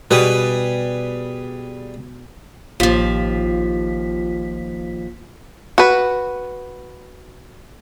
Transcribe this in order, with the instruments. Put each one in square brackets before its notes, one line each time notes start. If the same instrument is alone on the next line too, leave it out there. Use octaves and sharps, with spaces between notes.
[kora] B2 [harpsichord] G3 G#4 B4
[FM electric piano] A1 F4 B6 [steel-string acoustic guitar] D#2 F3
[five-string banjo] F#4 B4